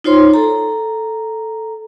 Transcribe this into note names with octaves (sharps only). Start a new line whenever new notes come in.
D#4 F4 C5 C#5 C6
A4 A#5